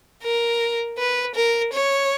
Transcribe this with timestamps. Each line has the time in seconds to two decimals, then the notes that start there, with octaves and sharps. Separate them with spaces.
0.23 A#4
0.98 B4
1.35 A#4
1.73 C#5